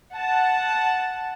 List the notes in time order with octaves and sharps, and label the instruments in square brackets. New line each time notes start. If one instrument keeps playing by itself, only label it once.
[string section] F#5 A5